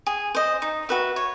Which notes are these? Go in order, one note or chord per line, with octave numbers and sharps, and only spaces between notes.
G#4
C5 D#5
D#4
F#4 B4 E5
C#5